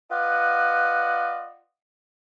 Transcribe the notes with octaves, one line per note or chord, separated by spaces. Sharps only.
F4 B4 D5 D#5 F#5